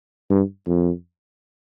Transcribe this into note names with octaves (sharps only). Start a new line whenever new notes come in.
G2
F2